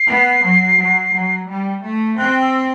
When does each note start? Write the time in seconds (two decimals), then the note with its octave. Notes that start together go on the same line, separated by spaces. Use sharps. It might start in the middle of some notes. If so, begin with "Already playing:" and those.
Already playing: C7
0.08 B3
0.43 F#3
0.78 F#3
1.13 F#3
1.48 G3
1.83 A3
2.18 C4 F#6
2.42 E6